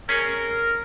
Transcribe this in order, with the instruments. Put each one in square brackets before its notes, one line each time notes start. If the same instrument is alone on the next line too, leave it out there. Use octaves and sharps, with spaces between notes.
[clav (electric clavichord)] C#4 G#4 C#5 [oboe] A#4